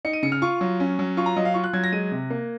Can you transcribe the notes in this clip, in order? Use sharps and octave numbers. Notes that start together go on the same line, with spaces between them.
D#4 C#7
D#7
C#3 C#7
F6
F4 C#6
F#3
C#4
F#3
F4 C#6
A#5
F#3 D#5
F5
F4 C#6
F#6
F#3 G#6
A#6
G#3 D#7
C3
A#3